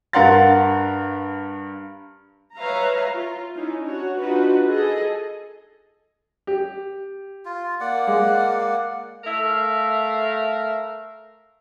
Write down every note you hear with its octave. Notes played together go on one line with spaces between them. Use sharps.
G2 A#4 F5 F#5 C6 A6
B4 C#5 E5 F5 A#5
F4
C#4 D#4 E4
D4 F#4 C#5
D4 D#4 F4 F#4 B4
G#4 A4 D#5
G4
F4
A#3 D5 F#5
G#3
A3 A#4 E5 F5